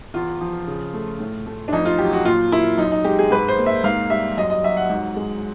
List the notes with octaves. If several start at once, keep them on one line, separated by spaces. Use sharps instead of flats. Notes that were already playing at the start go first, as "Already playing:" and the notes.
E2 F4
F3
C#3
A3
A2
A3
D4
F2 D#4
F4
F#3 G4
F#4
A#2 F4
A#3 E4
F#2 D#4
D#4
G#3 G4
G#4
G#2 B4
C5
A#3
E5
G#2 F5
G3 E5
F#2 D#5
D#5
F#3 E5
F#5
G#2
G#3